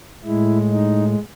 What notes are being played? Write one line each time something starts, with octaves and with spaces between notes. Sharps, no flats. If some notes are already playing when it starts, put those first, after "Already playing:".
A2 G#3 E4
D#4